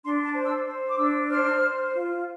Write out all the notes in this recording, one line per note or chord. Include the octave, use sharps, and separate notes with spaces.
D4 C6
A5
C5
E6
C5
D6
D4 E6
C5 F6
C5
F4